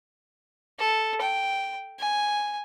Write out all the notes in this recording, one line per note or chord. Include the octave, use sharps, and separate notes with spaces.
A4
G5
G#5